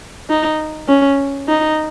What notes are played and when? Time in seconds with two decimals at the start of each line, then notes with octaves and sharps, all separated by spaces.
0.29 D#4
0.88 C#4
1.48 D#4